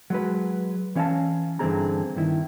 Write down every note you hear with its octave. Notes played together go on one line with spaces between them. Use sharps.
F#3 G#3 B4
E3 C#4 F5 F#5 A5
G2 D3 E3 C4 G#4 A#5
G2 D#3 E4